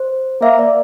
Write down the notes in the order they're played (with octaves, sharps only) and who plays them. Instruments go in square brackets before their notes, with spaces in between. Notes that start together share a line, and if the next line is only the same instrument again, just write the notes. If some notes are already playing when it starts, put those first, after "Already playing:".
Already playing: [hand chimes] C5
[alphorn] A#3 [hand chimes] E5
[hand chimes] D5